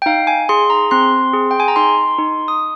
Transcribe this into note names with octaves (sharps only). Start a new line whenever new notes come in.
G5
D#4 F5
G#5
G#4 C6
A#5
C4 C6
G#4
G5
G#5
A#5
D#4 C6
D#4
D#6